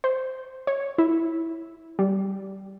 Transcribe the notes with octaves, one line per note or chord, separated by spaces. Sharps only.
C5
C#5
E4
G3